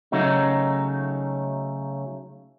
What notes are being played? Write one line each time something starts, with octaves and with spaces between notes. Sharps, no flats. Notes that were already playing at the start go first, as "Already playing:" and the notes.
C#3 F#3 A3 D#4